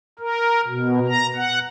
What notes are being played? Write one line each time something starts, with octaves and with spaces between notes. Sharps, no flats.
A#4
B2
A#5
F#5